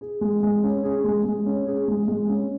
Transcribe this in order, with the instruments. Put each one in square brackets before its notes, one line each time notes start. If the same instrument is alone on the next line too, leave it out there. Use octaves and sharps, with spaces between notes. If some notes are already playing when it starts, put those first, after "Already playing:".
[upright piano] G#4
G#3
G#3
C#4
G#4
G#3
G#3
C#4
G#4
G#3
G#3
C#4